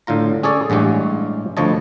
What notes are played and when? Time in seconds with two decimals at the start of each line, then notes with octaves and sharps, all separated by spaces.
0.07 A2 D3 F4 A#5
0.43 C#4 G#4 A4 C#5 D5
0.70 A1 G2 G#3 C#4 G4
1.57 D2 F3 C#5 D#5 A5